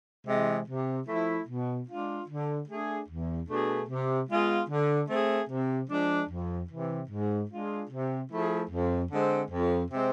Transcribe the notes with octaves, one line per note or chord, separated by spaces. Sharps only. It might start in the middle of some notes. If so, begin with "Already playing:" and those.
C3 E3 G#3
C3
F3 A3 E4
B2
G#3 D4 F4
D3
A3 D4 G#4
E2
B2 A3 D4 G#4
C3
G#3 B3 F4 G#4
D3
A3 C4 G#4
C3
F3 G#3 D4
F2
C3 E3
G#2
G#3 D4 F4 G#4
C3
F3 A3 E4 G#4
F2
D3 G#3 C4
F2
C3 G#3 C4